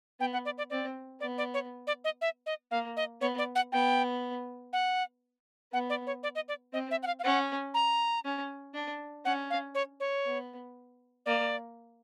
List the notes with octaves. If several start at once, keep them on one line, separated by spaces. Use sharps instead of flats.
B3 G5
F#5
D5
D5
C4 D5
B3 D5
D5
C#5
D5
D#5
E5
D#5
A#3 F5
D#5
B3 C#5
D5
F#5
B3 G5
F#5
B3 F#5
D5
C#5
D5
D#5
D5
C4 D#5
E5
F#5
F5
F5
C#4 F#5
A#5
C#4
D4
C#4 F#5
F5
C#5
C#5
B3
A#3 D5